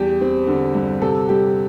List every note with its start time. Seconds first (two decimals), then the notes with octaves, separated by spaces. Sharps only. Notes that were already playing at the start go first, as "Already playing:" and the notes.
Already playing: E2 G3 G4
0.21 C4
0.47 D3
0.75 G2
1.01 C3 A4
1.29 G3 G4